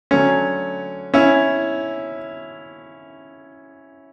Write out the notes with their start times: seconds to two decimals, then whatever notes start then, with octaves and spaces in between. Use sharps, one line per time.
0.11 D3 F#3 A3 C#4
1.14 C#4 E4